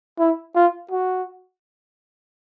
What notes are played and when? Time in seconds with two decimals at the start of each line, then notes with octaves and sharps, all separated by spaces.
0.19 E4
0.56 F4
0.91 F#4